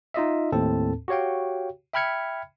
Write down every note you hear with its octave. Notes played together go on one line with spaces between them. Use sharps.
D#4 F4 D#5 E5
D#2 A2 C4 A4 A5
F#4 G4 C#5 F5 G5
E5 G5 B5 F6 G#6 C#7